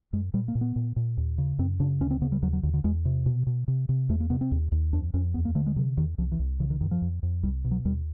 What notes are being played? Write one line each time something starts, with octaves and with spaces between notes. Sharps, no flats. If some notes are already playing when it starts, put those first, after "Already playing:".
F#2 G#3
A#2 G3
A#3
A#2
B3
A#2
A#2
D#2
C#3
F#2 C4
C#3 D4
D2 C#4
C4
C#3 B3
G3
D#2 F#3
F#3
D#2 D3
D3
E2 G#3
C3
B2
B2
C3
C3
E2 A3
A#3
C3 B3
C4
D#2
D#2
F2 D4
F2 C#4
D#2 B3
A#3
D3 A3
G#3
C3 F#3
E2 D#3
C2 F3
E3
C2
C#3 E3
D#3
F#2 D#3
F3
F2
F2
C2 G3
B2
F#3
D#2 G3